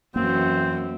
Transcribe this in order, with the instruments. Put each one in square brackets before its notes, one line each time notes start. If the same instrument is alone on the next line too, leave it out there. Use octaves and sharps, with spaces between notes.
[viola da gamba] F#2 [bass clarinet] E3 [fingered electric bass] A#3 [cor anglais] C4